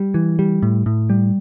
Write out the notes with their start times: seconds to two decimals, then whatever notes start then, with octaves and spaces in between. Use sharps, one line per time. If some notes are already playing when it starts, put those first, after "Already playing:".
Already playing: G3
0.14 E3
0.39 G3
0.63 A2
0.86 A2
1.10 G3